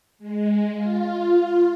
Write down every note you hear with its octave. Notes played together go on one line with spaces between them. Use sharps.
G#3
F4